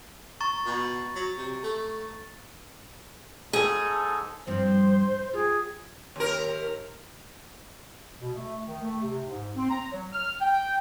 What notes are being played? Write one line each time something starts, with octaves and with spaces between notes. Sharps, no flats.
A#5 C#6 A6
B2
F#3
C3
A3
G#2 D#4 G#4 A4 G#5
G2 F3 C4 C5
F4 G4 G#4
D#2 A#4
B2
A3
D#3
A3
C3
G#2
C4
A#5
F#3
F6
G5